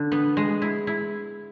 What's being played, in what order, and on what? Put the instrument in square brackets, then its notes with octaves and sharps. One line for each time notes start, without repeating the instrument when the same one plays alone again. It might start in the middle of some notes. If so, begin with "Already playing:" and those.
Already playing: [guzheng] D3 D4
B3
G#3
E4
E4